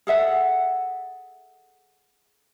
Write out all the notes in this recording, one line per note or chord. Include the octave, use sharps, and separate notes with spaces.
G#4 A4 E5 F#5